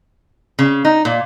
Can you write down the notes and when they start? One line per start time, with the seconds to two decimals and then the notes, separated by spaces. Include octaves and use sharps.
0.59 C#3
0.85 D#4
1.05 A#2